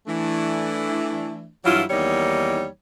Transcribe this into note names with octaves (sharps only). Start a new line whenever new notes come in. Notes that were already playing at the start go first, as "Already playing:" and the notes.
E3 A3 D4
G2 E3 F#3 E4 F4
E2 D#3 G3 A#3 D#4 C#5